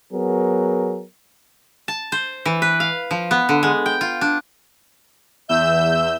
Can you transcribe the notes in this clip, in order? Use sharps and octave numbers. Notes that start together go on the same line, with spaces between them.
F#3 B3 G#4 A#4
A5
C5
E3
B4
F5
F3
B3
D3
G#3
G5
F4
D4
E2 E5 E6 G6